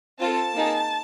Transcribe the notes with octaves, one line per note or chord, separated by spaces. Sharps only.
C4 F4 A4 A5
A#3 D#4 G#4